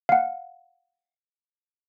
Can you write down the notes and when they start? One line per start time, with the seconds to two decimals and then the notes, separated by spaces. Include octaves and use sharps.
0.09 F5 F#5